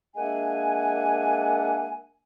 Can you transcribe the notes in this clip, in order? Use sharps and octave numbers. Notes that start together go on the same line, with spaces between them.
G#3 A#3 D4 E5 F#5 G#5